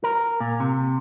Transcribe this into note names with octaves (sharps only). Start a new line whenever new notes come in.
A#4
A#2
C3